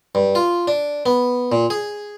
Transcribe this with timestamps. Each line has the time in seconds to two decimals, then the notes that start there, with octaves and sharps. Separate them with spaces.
0.15 G2
0.35 F4
0.68 D4
1.06 B3
1.52 A#2
1.70 G#4